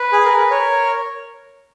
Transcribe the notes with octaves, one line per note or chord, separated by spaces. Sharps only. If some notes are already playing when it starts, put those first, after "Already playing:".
Already playing: B4
G#4
A#4
B4
A#4 C#5